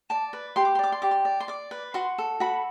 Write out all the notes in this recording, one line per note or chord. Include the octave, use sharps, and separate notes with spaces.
D5 A5
B4
G4 C6
D6
C6
D5 D6
C6
G4 D6
C6
D5
C6
D5 D6
B4
F#4 C6
A4
F#4 B5